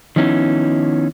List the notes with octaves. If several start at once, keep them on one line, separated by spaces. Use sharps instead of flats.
D#3 F3 B3 C#4 D#4 E4